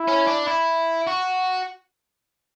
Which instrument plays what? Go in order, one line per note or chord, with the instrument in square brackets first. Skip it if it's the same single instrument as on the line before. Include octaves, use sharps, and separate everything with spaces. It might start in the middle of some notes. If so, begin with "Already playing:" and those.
Already playing: [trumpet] E4
[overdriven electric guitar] C#4
D4
E4
F#4